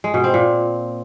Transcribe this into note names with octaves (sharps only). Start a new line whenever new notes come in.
G#3
B2
C4
A#2